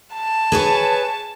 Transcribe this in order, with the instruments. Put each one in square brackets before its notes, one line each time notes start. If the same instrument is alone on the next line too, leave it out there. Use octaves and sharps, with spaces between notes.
[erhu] A5
[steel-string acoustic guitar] G#4 B4 C#5